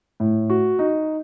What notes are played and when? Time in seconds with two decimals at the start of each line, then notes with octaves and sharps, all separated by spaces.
0.20 A2
0.50 F#4
0.79 D#4